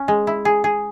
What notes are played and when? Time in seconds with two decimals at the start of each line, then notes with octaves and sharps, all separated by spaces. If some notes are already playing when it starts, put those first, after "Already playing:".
Already playing: C#4
0.08 G#3
0.27 E4
0.45 G#4
0.64 G#4